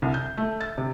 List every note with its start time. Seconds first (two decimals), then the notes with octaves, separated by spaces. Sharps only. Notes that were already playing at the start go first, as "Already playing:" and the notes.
0.02 C2
0.14 G6
0.38 A3
0.61 A6
0.78 C3